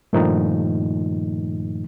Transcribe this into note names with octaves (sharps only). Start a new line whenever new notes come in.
G2 A#2 D#3 F3 A3 D#4